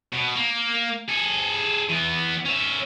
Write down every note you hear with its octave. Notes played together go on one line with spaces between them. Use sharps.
B2
A#3
G#4 A4
E3 B3
C#4 E5